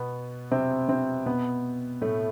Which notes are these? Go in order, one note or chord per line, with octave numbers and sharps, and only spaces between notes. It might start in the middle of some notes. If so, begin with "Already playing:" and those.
Already playing: B2 B3
C3 C4
C3 C4
B2 B3
A2 A3